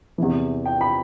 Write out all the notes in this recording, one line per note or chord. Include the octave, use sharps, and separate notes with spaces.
E2 C3 E3
G5
B5